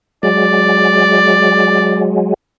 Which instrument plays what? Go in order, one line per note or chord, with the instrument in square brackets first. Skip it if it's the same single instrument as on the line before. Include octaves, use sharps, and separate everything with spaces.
[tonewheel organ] F#3 G#3 [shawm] D5